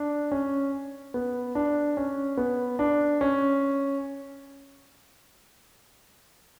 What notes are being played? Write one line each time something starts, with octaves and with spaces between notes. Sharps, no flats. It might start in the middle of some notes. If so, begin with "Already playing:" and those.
Already playing: D4
C#4
B3
D4
C#4
B3
D4
C#4